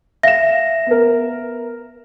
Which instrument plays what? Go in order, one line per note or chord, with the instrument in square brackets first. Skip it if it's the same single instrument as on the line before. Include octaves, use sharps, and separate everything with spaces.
[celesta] E5 A#6 [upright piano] F5 E7
[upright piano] B3 A#4